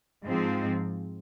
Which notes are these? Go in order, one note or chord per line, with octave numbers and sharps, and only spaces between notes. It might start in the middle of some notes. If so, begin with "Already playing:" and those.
G#2 F3 C4